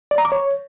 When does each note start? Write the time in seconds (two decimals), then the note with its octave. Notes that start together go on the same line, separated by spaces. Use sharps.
0.11 D5
0.18 A#5
0.25 D6
0.32 C#5